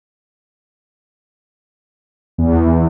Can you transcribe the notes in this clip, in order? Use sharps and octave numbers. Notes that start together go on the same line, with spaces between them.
E2